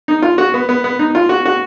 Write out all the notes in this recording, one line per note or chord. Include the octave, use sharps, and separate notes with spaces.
D#4
F4
F#4
B3
B3
B3
D#4
F4
F#4
F#4